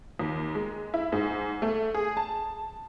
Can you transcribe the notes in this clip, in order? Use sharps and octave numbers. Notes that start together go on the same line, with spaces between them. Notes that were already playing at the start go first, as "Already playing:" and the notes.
D#2
G#3
E4
G#2
A3
G#4
A5